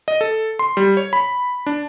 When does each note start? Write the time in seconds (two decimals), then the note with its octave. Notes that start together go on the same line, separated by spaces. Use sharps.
0.08 D#5
0.21 A4
0.59 C6
0.77 G3
0.97 C#5
1.13 B5
1.66 D4